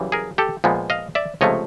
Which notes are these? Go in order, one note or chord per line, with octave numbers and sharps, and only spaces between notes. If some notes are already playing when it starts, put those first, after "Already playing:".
Already playing: F#2 C#3 E3 G3
G#4 A#4
G4 A4
A#2 F3 G#3 B3
D#5 F5
D5 E5
C#2 C3 F3 A3 C#5 D#5